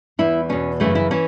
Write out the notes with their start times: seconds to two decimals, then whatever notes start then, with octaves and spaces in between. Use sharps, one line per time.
0.19 E2 E3 E4
0.49 E2 B2 C#4
0.80 F#2 C#3 E3 A3
0.95 E4
1.11 E3 C#4